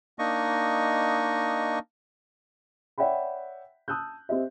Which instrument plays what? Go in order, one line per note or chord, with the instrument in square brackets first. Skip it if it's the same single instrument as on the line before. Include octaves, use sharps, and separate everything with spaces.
[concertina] A#3 D4 D#4 D#5 C#6
[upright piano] C#5 D5 E5 F#5 G5 B5
A5 D#6 E6 F#6 G6
C4 G4 D#5 E5